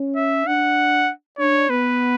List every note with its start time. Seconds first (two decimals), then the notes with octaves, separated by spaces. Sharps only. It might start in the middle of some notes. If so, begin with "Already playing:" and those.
Already playing: C#4
0.16 E5
0.47 D4 F#5
1.39 D4 C#5
1.69 B3 B4